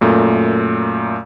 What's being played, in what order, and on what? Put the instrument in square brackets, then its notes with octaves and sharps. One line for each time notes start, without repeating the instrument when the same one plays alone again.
[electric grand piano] F#2 A#2 A3